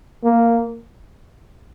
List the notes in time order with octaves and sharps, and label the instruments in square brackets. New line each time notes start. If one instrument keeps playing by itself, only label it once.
[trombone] A#3